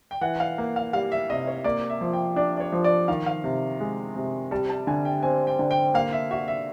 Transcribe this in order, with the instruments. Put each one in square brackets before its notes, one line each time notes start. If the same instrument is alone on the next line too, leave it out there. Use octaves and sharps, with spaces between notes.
[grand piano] G5
[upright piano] E3 [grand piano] F#5
[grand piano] F5
[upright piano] A#3
[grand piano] F5
[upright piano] G3 [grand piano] F5
[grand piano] E5
[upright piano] C3 [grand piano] D#5
[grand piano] C#5
[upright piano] A#3 [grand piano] D5
[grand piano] E5
[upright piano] F3
[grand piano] G5
[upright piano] D4 [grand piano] D5
[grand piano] D5
C#5
[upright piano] F3
[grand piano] D5
[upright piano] D#3 [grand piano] F5
[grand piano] F5
[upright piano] C3
G#3
C3
[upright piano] G3 [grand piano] A5
[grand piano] A5
[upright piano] D3 [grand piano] G#5
[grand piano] G5
[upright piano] C4 [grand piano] G#5
[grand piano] G5
[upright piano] D3
[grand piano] G5
[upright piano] A#3 [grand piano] F5
[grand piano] E5
[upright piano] F#4 [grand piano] E5
[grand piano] E5